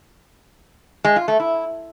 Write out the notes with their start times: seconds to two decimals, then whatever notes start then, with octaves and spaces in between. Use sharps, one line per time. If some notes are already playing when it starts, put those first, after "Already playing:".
1.04 G#3
1.16 F4
1.28 A3
1.40 E4